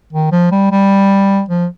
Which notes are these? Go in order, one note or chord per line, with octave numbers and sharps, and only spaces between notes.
D#3
F3
G3
G3
F3